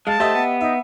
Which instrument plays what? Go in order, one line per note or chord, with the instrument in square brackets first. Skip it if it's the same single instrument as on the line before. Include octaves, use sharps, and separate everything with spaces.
[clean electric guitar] G#3 [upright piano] F5 [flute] A5
[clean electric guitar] A3 C5 [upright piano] G4 D#5 E5
[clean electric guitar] B3
[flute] D#4 [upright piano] E5